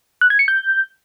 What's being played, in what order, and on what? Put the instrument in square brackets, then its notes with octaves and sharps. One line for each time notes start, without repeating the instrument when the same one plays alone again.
[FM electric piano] F#6
G#6
C#7
G6